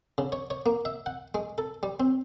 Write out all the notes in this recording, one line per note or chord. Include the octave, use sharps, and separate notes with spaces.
C#3
C#5
C#5
A#3
E5
F#5
G#3
A4
G3
C4